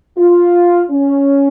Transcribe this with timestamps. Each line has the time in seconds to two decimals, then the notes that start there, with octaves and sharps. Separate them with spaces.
0.18 F4
0.91 C#4